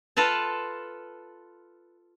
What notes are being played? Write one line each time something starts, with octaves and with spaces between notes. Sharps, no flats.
F4 A4 B4 F5 A5